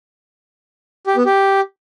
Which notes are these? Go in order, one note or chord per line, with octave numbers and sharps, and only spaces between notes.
G4
B3
G4